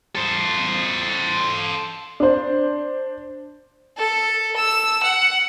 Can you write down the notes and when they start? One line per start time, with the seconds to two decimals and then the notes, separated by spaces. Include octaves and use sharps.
0.15 A4 C5
2.20 D4 C5
3.97 A4
4.56 E6
5.03 F#5